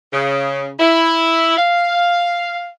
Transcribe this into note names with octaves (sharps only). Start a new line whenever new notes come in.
C#3
E4
F5